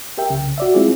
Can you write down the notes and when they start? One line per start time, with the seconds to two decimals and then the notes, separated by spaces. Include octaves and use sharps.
0.18 G4 A#4 E5 G5
0.30 C2 C#3
0.58 F#4 D5 E5
0.74 G#3 C4 E4 F4 G#4